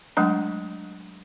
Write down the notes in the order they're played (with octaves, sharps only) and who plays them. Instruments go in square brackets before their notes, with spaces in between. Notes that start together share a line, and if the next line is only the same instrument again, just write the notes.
[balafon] F#3 G#3 A3 D4 A#5